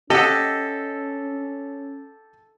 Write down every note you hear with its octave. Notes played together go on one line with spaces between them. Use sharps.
C#4 G4 A4 D#5 F#5